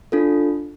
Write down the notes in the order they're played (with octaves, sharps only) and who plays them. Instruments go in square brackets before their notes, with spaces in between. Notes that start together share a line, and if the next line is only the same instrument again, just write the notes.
[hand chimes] D4 F4 A4